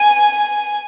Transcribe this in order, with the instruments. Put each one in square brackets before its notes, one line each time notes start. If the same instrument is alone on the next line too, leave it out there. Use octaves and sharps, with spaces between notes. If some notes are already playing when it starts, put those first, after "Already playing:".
Already playing: [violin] G#5